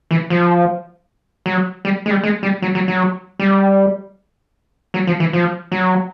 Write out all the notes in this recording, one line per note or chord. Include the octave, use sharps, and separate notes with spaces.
E3
F3
F#3
G3
G#3
G3
G#3
G3
F#3
F#3
F#3
G3
F#3
F3
E3
F3
F#3